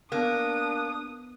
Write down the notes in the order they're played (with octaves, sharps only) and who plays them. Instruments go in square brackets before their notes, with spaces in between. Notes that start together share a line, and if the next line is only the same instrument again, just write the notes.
[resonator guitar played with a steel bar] A#3 [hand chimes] B3 F#6 [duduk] D4 [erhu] D#6